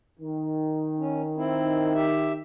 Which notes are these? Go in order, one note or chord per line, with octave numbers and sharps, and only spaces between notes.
D#3
C#4
C4 E4
G4 E5